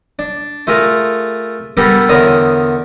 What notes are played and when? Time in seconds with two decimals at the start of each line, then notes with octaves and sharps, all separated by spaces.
0.19 D4
0.67 A3 F4 G#4 A#4
1.77 G3 B3 D4 A4 A#4
2.09 E2 D3 A#4 C#5 D#6